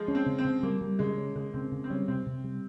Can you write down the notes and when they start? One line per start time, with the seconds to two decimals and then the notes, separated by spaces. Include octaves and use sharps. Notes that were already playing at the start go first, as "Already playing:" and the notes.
Already playing: F3 G#3
0.08 C#4
0.15 C4
0.26 C#3
0.38 C4
0.45 C#3
0.63 G3 A#3
0.81 G3
0.99 C#3 G#3
1.17 C#4
1.35 C#3 G#3
1.54 C#3 C4
1.72 C#3
1.84 C4
1.90 G3 C#4
2.08 C3 C4
2.26 C3
2.44 G3